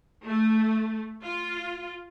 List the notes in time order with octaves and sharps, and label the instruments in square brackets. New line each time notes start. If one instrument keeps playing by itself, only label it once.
[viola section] A3
F4